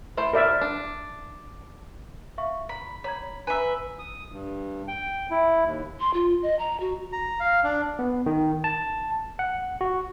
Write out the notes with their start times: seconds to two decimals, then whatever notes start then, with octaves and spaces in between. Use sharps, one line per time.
0.17 A3 E4 C5
0.33 A#4 D5 E5
0.61 D4
2.38 E5 F5 C#6
2.69 A#5 B5
3.04 C#5 A#5 B5 G#6
3.47 B4 E5 G#5 A#5
3.99 D#6
4.32 G2
4.88 G5
5.30 E4
5.66 D#2
6.00 C6
6.14 F4
6.43 D#5
6.59 A#5
6.80 F#4
7.13 A#5
7.40 F5
7.64 D4
7.99 B3
8.26 D#3
8.64 A5
9.39 F#5
9.81 F#4